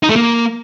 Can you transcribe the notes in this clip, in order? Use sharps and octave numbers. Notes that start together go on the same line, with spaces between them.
D#4
A3
A#3